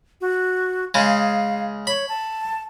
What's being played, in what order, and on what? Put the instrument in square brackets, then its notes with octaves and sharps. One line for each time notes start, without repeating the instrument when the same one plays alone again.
[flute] F#4
[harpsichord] C#3 G#3 [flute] F5
[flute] C#5 [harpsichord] B5
[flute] A5